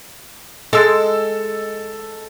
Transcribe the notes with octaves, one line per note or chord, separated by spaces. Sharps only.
G#3 A4 E6 A6